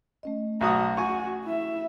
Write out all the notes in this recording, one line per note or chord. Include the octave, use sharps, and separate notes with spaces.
A3 C#4 D#5
B1 F#4 A#5 D#6
F#4 G#5 C#6
E4 E5